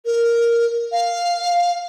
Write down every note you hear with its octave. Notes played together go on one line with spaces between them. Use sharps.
A#4
F5